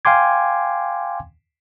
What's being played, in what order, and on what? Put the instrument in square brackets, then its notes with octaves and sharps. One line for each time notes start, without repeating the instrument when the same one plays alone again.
[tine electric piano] F5 G5 G#5 C6 D6 G#6